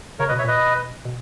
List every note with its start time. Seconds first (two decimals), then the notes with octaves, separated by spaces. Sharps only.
0.19 C#3 A#4 C#5
0.29 B2 B4 D#5
0.38 C#5 E5
0.44 A#2 B4 D#5
0.56 B2
1.05 B2